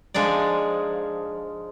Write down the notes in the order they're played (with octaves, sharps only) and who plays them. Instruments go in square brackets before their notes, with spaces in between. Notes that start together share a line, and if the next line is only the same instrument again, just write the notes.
[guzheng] F3 G#3 D4 D#4 D5